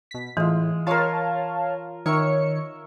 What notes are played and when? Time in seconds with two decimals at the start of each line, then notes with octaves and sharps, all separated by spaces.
0.11 B2 B6
0.37 A2 E3 G#3 F4
0.87 F4 A#4 C#5 F5 A5
2.06 D#3 A#4 C#5 E5 C#6 C#7